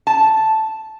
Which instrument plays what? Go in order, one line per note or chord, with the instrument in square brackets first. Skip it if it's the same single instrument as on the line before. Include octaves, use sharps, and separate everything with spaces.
[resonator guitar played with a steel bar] A5